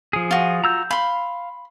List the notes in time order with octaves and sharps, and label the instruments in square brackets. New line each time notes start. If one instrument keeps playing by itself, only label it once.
[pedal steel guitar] F3 G#4
[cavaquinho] F4 F#4
[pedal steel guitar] A#5 E6 G6
[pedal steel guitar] F5 [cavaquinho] B5 C6